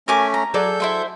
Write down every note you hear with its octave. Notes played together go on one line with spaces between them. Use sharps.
A3 C#4 A#4 G#5 D6
A#5
F#3 G#4 A4 D5 G6
E4 C5 E5